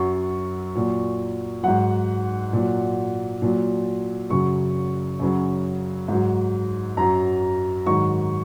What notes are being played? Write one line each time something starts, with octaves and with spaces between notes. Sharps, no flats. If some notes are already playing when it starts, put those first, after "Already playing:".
Already playing: F#2 F#3 C#6
A#2 F#3
G#2 F#3 F#5
A#2 F#3
A#2 F#3
F#2 C#3 F#3 C#6
F#2 C#3 F#3
G#2 F#3
F#2 F#3 A#5
G#2 D#3 F#3 C#6